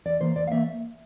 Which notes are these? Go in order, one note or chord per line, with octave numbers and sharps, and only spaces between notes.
E2 D5
E3 A#3 C5
E2 D5
F5
E3 A#3 E5